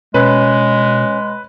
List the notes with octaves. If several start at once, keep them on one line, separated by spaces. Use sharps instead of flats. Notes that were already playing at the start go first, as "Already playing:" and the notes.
B2 G#3 C#4 B4